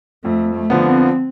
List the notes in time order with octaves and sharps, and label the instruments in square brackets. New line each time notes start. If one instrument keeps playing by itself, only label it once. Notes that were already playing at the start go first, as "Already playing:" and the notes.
[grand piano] F2 [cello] A3
[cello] A3
[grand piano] D3 F3 B3
[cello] C4